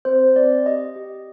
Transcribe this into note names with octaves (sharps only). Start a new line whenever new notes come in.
C4 C5
C4 D5
G4 D#5
G4